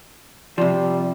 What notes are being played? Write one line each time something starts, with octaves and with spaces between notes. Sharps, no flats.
C3 F3 G3